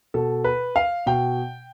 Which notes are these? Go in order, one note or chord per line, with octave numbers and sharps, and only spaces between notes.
B2 A4
B4
F5
B2 G5